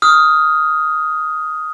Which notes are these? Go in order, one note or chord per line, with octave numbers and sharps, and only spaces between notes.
D#6 F6